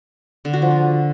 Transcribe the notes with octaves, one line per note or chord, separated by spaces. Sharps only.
D3
F#4
F3
D4